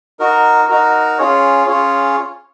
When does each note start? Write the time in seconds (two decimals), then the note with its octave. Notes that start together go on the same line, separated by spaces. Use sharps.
0.20 D#4 F#4 A#4
0.69 D#4 F#4 A#4
1.19 C#4 F4 G#4 C#5
1.67 C#4 F4 G#4 C#5